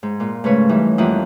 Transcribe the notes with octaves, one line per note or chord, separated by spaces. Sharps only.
G#2
A#2
G#2 C#3 A3 B4 C#5
E3 G3 D#4
F2 G3 A#3 E4 F#5 D#6